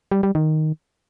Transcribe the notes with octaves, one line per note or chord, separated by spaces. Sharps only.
G3
G3
D#3